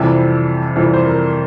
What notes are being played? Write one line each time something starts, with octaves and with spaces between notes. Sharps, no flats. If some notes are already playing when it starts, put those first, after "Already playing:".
Already playing: F2 C3 E3 G3 A5
F2 C3 E3 G3
C5
A#4